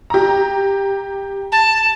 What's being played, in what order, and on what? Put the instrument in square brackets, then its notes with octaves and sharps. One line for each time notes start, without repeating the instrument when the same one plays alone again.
[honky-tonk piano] G4 A#5
[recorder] A5